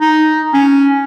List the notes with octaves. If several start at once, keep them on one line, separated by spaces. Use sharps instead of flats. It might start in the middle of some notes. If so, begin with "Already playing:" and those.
D#4
C#4